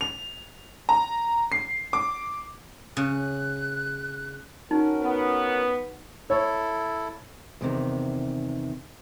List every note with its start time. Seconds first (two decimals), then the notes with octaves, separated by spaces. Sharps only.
0.01 F7
0.89 A#5
1.52 C7
1.93 D6
2.97 C#3 F#6
4.71 C#4 D#4 F#4 A#4
5.02 B3
6.30 E4 A4 C#5
7.61 E2 C3 D#3